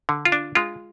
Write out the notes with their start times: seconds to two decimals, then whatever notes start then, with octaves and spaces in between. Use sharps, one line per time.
0.09 D3
0.25 F4
0.32 D4
0.55 G#3 F4